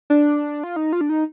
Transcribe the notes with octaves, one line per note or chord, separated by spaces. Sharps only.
D4
F4
D#4
F4
D4
D#4